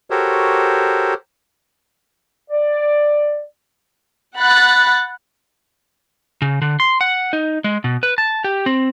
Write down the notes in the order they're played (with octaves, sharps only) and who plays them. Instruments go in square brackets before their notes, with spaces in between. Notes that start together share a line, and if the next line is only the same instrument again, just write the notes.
[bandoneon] F#4 G4 A4 A#4 C5 C#5
[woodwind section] D5
[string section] F#5 B5 F#6 A6
[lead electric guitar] C#3
D3
C6
F#5
D#4
G#3
B2
B4
A5
G4
C4